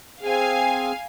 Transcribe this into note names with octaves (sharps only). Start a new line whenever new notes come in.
C4 G#4 F5 G#5